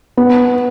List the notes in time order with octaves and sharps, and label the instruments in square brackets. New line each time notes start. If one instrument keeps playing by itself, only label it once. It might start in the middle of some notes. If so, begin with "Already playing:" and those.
[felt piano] B3